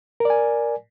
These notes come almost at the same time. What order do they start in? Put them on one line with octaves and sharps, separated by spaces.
A#4 D5 G#5